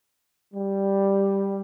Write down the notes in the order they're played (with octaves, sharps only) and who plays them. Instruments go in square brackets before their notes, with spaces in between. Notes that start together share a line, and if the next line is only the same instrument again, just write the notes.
[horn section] G3